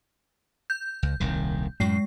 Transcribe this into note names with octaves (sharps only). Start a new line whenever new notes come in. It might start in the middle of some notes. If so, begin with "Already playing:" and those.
G6
C#2
D#1 C2 D#3
F#2 A2 G#3 C7